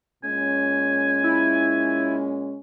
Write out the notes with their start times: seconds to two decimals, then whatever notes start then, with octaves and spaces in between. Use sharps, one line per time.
0.24 A#2 G#3 C#4 G#5
1.24 E4